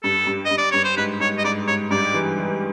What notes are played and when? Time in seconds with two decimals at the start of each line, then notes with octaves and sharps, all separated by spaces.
0.03 G2 A4
0.27 G2
0.45 D#5
0.51 G2
0.58 D5
0.71 G2 C#5
0.84 C5
0.97 G#2 B4
1.20 G#2 C#5
1.38 D#5
1.44 G#2 D5
1.68 G#2 C#5
1.91 G2 D5
2.14 E3
2.38 E3